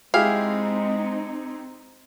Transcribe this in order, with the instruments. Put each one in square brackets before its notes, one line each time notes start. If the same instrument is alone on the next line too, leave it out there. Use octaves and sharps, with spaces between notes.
[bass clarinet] G#3 [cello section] C4 D#4 [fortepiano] E4 G4 G#4 [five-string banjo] F5